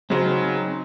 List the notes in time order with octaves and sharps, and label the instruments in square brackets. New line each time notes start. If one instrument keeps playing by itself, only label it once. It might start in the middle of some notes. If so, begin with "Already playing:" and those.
[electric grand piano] C#3 F#3 [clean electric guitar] C4 D#4 C5